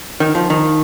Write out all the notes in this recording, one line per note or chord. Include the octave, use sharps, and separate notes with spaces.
D#3
F3
D#3